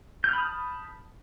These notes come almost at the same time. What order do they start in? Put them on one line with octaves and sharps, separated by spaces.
G6 F6 B5 D#6 A5